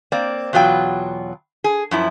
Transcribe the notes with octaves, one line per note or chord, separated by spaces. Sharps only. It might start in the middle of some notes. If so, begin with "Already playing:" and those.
A#3 C4 D5
E2 B2 F#3 F4 G5
G#4
F#2 F3 E4